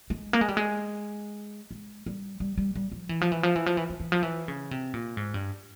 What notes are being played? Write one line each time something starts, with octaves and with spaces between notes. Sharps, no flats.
G#3
A#3
G#3
G3
G#3
G#3
G3
G3
G3
G3
F3
E3
F3
E3
F3
E3
F3
E3
F3
E3
F3
E3
C#3
C3
A#2
G#2
G2